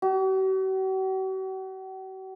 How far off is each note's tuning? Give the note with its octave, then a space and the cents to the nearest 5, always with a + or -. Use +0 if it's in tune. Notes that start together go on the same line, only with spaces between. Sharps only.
F#4 +45